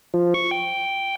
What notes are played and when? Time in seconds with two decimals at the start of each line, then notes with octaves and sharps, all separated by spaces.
0.14 F3
0.34 C#6
0.51 G5